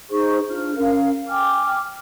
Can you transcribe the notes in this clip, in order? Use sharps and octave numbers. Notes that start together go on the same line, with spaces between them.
D#4 G#4 C5 C#6
D4 F4 F6
C#4 A#4 F5
G5 G#5 D6 F6